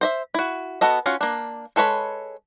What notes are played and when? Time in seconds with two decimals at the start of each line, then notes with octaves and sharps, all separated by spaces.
0.01 C5 D#5 E5
0.34 E4 F#4
0.81 B3 F#4 A4 D#5
1.06 C#4 F4 F#4 F5
1.21 A#3 D4
1.76 G#3 A4 B4 C#5 B5